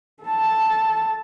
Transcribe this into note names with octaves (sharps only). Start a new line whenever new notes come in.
A4 A5